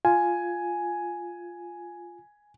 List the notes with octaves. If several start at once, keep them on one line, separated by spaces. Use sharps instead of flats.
F4 G#5